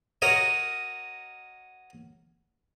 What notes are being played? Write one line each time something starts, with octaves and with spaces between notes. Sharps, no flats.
F#4 A#4 C#5 D#5